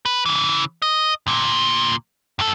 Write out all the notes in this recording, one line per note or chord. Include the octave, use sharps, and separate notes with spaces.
B4
C#3 E3
D#5
D2 A#2
G2 A4